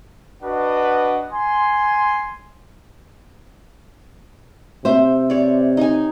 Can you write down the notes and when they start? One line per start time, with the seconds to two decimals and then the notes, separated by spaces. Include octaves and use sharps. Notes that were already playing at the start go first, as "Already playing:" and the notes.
0.42 D4 F#4 B4 D#5 F#5
1.31 G#5 C6
4.85 C3 C5 E5
5.30 C#5 D5
5.77 D#4 G#5